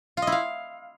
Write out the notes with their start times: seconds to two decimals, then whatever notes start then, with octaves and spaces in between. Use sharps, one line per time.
0.17 F4
0.22 D#5
0.27 E4
0.32 F5